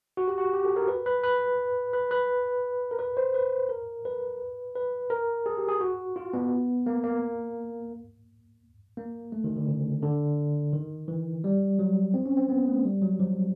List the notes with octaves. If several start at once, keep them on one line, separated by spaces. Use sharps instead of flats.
F#4
G4
F#4
G4
A4
A#4
B4
B4
B4
B4
B4
A#4
B4
C5
B4
A#4
B4
B4
A#4
G#4
G4
G#4
F#4
F4
B3
A#3
A#3
A#3
A3
D#3
D3
C#3
D3
D#3
E3
G3
F#3
C4
C#4
C4
B3
A3
G3
F#3
F3